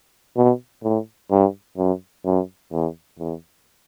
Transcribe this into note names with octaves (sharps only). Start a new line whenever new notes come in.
B2
A2
G2
F#2
F#2
E2
E2